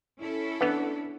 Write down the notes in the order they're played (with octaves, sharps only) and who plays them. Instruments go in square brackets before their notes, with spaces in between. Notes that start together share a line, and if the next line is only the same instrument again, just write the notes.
[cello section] C#4 E4 A4
[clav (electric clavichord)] E3 B3 [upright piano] D4